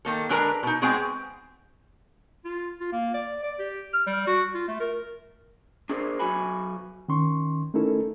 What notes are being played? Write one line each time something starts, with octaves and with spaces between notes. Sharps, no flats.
D#3 A#3 A4
D3 G#3 D4 A#4 B4 A#5
B2 D#4
G#3 B3 C4 F#4 G#4
F4
F4
A#3
D5
D5
G4
F6
G3
F#4
F4
A3
A#4
D4 G#4 A#4 C5
B1 G#2 F#3 F#4 G#5 B5
D#3 C#4 C6 C#6
A3 C#4 D#4 E4 A4 A#4